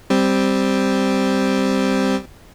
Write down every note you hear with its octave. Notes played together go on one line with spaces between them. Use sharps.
G3 C4